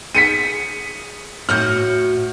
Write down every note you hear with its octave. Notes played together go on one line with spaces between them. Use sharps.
G#4 B6 C#7 D#7
A2 F#4 F#5 F6 G6